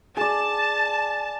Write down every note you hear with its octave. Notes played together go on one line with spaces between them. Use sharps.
G#4 D5 A5